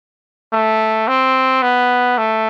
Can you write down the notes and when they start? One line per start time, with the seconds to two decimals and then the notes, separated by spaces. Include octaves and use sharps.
0.53 A3
1.08 C4
1.62 B3
2.18 A3